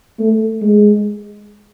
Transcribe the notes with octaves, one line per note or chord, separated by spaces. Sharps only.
A3
G#3